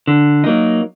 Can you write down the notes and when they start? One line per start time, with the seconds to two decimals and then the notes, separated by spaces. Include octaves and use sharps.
0.07 D3
0.44 F#3 A#3 D#4